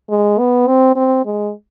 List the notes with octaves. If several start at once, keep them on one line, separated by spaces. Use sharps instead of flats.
G#3
B3
C4
C4
G#3